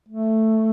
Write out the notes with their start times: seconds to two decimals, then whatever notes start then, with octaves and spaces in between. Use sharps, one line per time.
0.09 A3